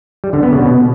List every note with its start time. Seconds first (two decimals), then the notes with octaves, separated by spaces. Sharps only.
0.24 G3
0.33 D3
0.43 B3
0.52 C#3
0.62 B2